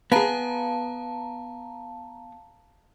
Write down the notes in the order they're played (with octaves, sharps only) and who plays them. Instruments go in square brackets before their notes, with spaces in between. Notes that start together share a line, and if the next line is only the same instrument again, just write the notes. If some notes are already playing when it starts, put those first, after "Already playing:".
[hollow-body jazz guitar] B3 G#4 [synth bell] F5 A5 A#5